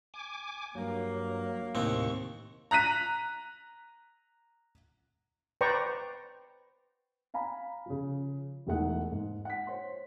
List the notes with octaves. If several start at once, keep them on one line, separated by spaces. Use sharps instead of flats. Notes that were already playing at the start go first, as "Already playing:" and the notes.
G#5 D6
G2 F#3 A#3
D#2 A2 C3 C4 C#6
A#5 F#6 B6 D#7
B4 C5 D5 G5 A#5 C#6
F5 G#5 A#5 B5
C#3 F3
E1 E2 G#3 A3 D#4 F#5
G#2
F#5 B6
C5 C#5 C6